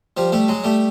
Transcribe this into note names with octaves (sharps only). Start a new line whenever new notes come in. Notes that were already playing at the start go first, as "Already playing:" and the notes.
F3 G3
G3 A3
F#3 G#3
G3 A3